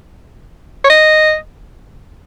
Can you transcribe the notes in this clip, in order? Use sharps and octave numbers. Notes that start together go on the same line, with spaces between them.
C#5
D#5